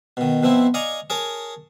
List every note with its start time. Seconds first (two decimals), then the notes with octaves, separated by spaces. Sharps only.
0.17 B2 D#3
0.43 B2 F3 C4 E4
0.74 D5 D#5 F5 G#5 A#5 C#6
1.10 G#4 A#4 C#5 G#5 A5